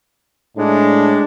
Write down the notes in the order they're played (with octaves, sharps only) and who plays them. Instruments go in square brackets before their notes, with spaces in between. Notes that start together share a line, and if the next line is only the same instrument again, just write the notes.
[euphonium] A2 [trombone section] G#3 D4